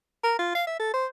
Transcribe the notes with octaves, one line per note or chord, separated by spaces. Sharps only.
A#4
F4
F5
E5
A4
C5